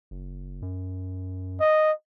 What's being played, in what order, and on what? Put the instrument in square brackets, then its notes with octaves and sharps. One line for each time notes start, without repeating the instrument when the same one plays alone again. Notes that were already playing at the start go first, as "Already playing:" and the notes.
[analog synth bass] F#1
F#2
[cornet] D#5